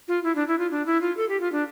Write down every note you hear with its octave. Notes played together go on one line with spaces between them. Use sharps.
F4
E4
D4
E4
F4
D4
E4
F4
A4
G4
F4
D4